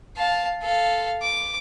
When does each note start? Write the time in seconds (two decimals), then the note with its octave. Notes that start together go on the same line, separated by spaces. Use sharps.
0.17 F5 A5
0.62 A4 F5
1.22 D6